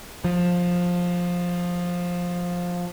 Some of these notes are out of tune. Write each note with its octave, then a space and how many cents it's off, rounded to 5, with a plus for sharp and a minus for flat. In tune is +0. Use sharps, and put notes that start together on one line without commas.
F3 +15